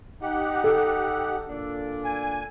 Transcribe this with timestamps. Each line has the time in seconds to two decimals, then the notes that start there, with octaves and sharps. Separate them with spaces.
0.22 D#4 G4 F#5
0.64 A4
1.49 A#2 D4 D5
2.04 G#5